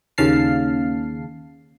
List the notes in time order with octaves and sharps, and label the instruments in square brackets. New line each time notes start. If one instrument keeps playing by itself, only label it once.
[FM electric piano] D#2 C#3 F5 A5 C7